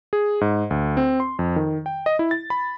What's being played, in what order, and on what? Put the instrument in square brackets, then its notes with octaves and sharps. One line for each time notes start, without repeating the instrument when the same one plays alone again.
[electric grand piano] G#4
G#2
D2
C4
C6
F2
D#3
G5
D#5
E4
A6
B5